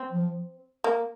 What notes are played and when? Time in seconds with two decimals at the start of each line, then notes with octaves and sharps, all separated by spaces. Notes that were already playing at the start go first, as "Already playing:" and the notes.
Already playing: C4
0.11 F3
0.84 A#3